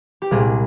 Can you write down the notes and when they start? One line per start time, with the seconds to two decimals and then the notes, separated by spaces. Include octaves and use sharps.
0.22 G4
0.31 C2 A#2 G#3 G#4